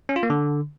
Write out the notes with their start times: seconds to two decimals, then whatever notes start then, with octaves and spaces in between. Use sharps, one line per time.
0.09 C#4
0.16 F4
0.23 A#3
0.30 D3